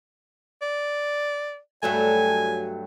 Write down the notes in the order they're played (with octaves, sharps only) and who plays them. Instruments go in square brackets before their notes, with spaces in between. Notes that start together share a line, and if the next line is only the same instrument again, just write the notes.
[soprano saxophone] D5
[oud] G2 F#3 A3 [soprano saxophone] G#5